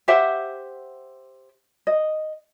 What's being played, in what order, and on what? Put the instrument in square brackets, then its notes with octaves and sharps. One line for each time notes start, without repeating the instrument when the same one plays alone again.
[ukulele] G4 C5 E5 F#5
D#5